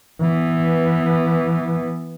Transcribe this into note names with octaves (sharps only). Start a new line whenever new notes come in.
E3 B3